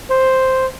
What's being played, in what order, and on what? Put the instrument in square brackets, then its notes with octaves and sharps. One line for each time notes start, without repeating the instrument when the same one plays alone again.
[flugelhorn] C5